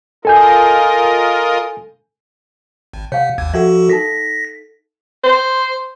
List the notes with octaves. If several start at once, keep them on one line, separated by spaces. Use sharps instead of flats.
F4 A4 A#4 D#5 G#5 G6
G#1
C3 C#5 F5 F#5
G#1 D#2 G#6
F3 F#4 A4 E5 F#5
D#4 A4 A#6 B6
C5